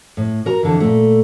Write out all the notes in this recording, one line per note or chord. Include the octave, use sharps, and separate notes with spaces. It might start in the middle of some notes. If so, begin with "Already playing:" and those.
A2
F#4 A#4 A#5
F2 D3 E3
A#2 A3